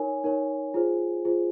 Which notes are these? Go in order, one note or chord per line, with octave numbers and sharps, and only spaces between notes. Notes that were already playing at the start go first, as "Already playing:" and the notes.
Already playing: D#4 A#4 C#5 G#5
D#4 A#4 C#5
F4 G#4 C5
F4 G#4 C5